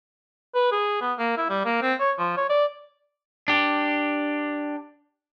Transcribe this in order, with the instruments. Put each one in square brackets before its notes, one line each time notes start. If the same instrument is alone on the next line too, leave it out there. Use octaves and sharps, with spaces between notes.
[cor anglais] B4
G#4
B3
A#3
E4
G3
A#3
C4
C#5
F3
C#5
D5
[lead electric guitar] D4 G4